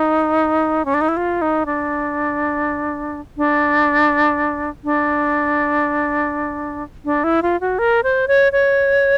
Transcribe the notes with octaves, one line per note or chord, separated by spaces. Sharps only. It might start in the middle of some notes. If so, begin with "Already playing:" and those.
Already playing: D#4
C#4
D4
D#4
E4
F4
D#4
D4
D4
D4
D4
E4
F4
F#4
A#4
C5
C#5
C#5